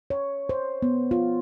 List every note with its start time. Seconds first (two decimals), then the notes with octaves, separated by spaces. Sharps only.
0.10 C#5
0.49 C5
0.82 B3
1.11 F4